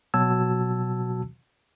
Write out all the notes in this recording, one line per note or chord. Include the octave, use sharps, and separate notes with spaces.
B2 F#3 F#4 A5 E6 G#6